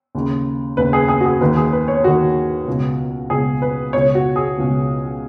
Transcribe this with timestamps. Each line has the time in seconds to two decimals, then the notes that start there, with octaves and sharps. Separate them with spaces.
0.15 D#2 C#3
0.77 D#2 C#3 B4
0.93 G#4
1.08 G#4
1.21 F#4
1.25 G#4
1.41 D#2 D#3 B4
1.57 G#4
1.72 B4
1.88 C#5
2.04 D#2 D#3 F#4
2.68 C#2 B2
3.30 C#2 B2 G#4
3.62 B4
3.93 C#2 B2 C#5
4.15 F#4
4.36 G#4
4.57 C#2 B2